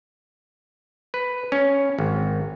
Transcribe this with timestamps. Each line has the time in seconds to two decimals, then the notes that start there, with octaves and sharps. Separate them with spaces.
1.14 B4
1.52 C#4
1.99 G#1